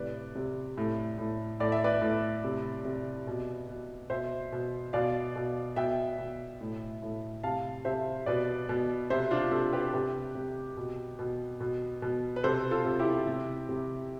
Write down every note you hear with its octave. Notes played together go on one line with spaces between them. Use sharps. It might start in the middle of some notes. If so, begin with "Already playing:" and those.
Already playing: A2 C3 B4 D5
C3
A2
A2
A2 D5
E5
B4 D5
A2
C3
C3
B2
B2
B2 C5 E5
B2
B2 D5 F5
B2
B2 E5 G5
B2
A2
A2
C3 F5 A5
C3 C5 E5
B2 B4 D5
B2
C3 C5 E5
D4 F4
C3 F4 A4
G4 B4
C3 G4 B4
C3
B2
B2
B2
B2
B4
C3 A4 C5
F4 A4
C3
E4 G4
C3
C3